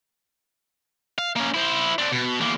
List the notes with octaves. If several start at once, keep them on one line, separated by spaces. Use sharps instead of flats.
F5
A#3 C#4
E4 C5
C4 D4
B2
E2 A#3